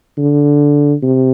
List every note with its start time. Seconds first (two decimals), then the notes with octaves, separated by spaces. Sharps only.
0.18 D3
1.03 C3